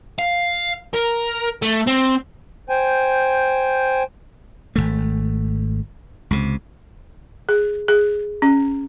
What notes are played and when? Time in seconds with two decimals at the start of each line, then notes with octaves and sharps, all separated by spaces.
0.19 F5
0.95 A#4
1.62 A3
1.87 C4
2.69 C5 G5 G#5
4.76 G#1 F2 A3
6.31 C#2 C3
7.49 G#4
7.88 G#4
8.42 C#4